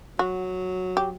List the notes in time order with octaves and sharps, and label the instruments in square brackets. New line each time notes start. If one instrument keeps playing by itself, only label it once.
[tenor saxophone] F#3 [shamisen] F#4
[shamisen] G4